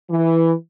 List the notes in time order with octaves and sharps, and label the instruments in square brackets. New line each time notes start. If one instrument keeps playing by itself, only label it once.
[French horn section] E3